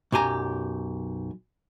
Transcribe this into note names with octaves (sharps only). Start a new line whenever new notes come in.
B1 F#2 G4 G#5 A#5